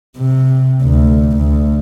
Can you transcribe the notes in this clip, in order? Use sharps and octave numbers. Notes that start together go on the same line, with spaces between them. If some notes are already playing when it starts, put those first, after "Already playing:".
C3
D2
D2